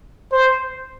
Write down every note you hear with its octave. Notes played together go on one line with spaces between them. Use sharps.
C5